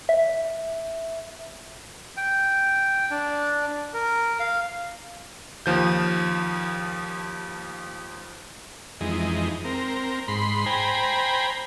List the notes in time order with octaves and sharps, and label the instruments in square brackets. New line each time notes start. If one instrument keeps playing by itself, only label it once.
[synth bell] E5
[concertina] G5
D4
A#4
F5
[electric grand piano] D#2 F3 G6
[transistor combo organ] F2 E3 G#3 D#4
C4 A#4
G#2 B5 C6
C5 G5 G#5 A#5 B5